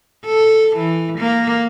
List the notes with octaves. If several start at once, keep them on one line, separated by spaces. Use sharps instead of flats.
A4
E3
A#3